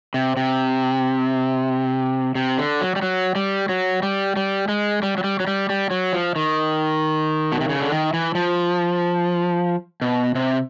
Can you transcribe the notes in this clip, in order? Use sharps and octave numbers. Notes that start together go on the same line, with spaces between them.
C3
C3
C3
D3
F#3
G3
F#3
G3
F#3
G3
G3
G#3
G3
F#3
G3
F#3
G3
G3
F#3
F3
D#3
B2
C3
C#3
D3
D#3
E3
F3
B2
C3